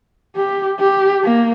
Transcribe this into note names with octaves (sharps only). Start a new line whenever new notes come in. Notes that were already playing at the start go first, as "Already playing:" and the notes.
G4
G4
A#3